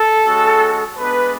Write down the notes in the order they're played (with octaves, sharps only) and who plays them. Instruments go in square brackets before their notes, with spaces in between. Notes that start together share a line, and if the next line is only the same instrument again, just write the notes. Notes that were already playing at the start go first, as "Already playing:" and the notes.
Already playing: [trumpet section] A4
G#3 C#4 F#4
G#3 B3 D4 B4